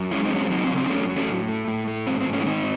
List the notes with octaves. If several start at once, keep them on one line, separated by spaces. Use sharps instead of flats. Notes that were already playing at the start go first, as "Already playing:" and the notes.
Already playing: F#2
G#3 C#4 E4
C4 D#4
F#2 C#4
C4
F#3 C4 D#4
C4
C#3
C4
D#4
F#2 A3 C#4
F#3
A3 C#4
A2
A3
A2
A3
G#2 C4
C4
G#2
A3 C#4
E4
D#3 C4 D#4